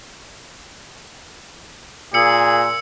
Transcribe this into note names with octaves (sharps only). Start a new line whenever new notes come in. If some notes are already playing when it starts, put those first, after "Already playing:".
A#2 G#4 E6 C#7